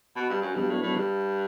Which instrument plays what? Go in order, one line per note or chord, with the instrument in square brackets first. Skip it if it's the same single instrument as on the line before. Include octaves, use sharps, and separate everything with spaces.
[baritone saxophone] B2
G2
F#2
[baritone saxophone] G2 [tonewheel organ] F#3 B3 D4
[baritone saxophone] A2
A2
G2